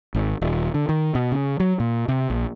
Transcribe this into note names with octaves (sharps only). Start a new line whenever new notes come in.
G#1
D#1
D3
D#3
B2
C#3
F#3
A#2
C3
A#1